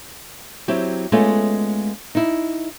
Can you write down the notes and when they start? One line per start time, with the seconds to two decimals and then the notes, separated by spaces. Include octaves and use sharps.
0.68 F#3 C4 E4 G4
1.12 G#3 A3 B3 C#4 F4
2.15 D#4 E4